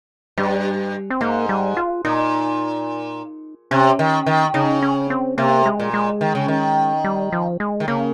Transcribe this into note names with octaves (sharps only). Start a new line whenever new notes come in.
G2 G3
C4
G#2 A#3
G3
F4
A#2 D#4
C3 C#4
D#3
D#3
C#3 D#4
C#4
C4
C3 A#3
G#3
A#2
G#3
D#3
C#3
D#3
G3
F3
G#3
D#3
C#3 A#3